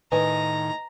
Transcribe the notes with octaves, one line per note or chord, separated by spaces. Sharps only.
A2 D#3 B4 D#5 G#5 A#5